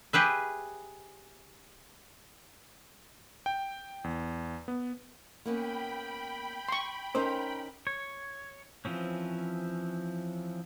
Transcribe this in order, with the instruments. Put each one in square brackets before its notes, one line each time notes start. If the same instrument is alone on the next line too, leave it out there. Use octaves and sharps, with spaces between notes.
[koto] G4 G#4 B4 E5
[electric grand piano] G5
E2
B3
[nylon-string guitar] A#3 B3 C#4 [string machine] G5 B5
[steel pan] C6 C#6
[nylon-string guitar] C#4 D#4 A#4 [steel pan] C5
[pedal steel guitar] C#5
E3 F3 C4 C#4